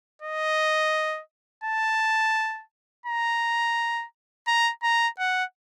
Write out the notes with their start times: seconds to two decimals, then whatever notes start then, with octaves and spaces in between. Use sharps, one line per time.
0.22 D#5
1.64 A5
3.06 A#5
4.47 A#5
4.83 A#5
5.19 F#5